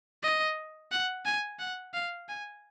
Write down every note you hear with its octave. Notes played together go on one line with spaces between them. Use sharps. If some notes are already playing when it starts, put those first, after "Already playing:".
D#5
F#5
G#5
F#5
F5
G#5